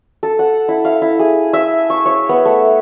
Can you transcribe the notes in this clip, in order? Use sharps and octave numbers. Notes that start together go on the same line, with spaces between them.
A4
F#5
E4
F5
E4
G#4
E5
C#6
C#5
B3
A3